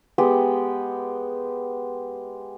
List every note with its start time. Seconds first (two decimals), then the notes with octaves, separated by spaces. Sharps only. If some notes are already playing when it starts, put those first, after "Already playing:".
0.18 G#3 B3 G4